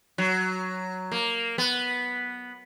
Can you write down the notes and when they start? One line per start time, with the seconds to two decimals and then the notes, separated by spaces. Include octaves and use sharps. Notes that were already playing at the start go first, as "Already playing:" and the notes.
0.18 F#3
1.12 A#3
1.58 B3